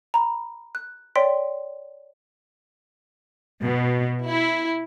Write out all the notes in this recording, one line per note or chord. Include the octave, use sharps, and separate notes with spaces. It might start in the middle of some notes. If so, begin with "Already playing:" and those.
A#5 B5
F#6
C#5 D5 G5 C6 B6 D7
B2
E4